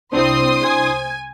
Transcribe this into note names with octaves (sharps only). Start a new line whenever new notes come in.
C2 C4 D4 E4 C5 C6 D#6
G#5